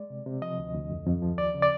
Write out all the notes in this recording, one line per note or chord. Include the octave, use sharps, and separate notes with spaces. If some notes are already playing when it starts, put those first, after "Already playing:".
Already playing: G#3 D5
C3
C3
F3 D#5
D2
D2
F2
F2
F3
D#2 D5
C#3
D5